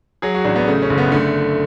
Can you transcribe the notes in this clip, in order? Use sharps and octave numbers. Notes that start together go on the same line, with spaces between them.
F#3 G#4
F#4
A1 D4
B3
C#3 A3
C#4
F#1
B3
D3 A3